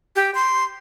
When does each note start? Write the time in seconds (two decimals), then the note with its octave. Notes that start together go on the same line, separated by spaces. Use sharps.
0.16 G4
0.35 C6